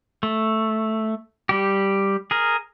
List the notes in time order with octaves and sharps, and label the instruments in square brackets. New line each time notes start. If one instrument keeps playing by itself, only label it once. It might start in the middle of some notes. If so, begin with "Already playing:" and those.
[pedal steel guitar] A3
G3 G4
G#4 A#4